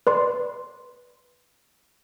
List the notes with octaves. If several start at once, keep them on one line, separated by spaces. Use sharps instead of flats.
B4 D5 C6